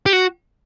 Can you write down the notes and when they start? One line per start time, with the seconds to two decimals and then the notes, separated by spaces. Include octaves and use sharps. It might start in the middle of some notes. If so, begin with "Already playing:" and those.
0.06 G4
0.13 F#4